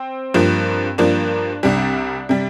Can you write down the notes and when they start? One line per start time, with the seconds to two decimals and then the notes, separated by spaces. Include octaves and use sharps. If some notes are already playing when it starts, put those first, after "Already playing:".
Already playing: C4
0.34 G2 F3 A#3
0.98 G2 F3 A#3 D4
1.63 C2 C3 G3 D4
2.29 C3 G3